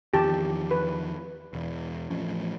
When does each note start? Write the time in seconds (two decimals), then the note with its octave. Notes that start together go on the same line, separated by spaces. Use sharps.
0.14 E2 D#3 F3 G4 A5
0.71 B4
1.53 E1 E2
2.10 A1 F3 C#4